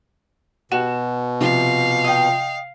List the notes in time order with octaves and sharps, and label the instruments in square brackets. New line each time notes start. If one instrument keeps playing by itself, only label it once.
[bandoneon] B2 [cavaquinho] F#4 [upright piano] E7
[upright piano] C3 F3 [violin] F5
[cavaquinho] D#5 G5